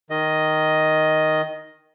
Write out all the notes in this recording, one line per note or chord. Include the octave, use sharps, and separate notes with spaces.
D#3 D#5